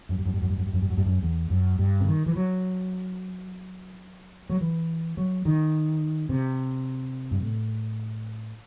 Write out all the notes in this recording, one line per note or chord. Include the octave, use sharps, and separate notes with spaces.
F#2
G2
F#2
G2
F#2
G2
F#2
G2
F#2
G2
F#2
G2
F#2
E2
F#2
G2
C3
D#3
E3
F#3
F#3
E3
F#3
D#3
C3
G2
A2